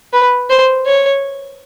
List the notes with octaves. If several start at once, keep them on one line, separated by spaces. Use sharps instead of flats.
B4
C5
C#5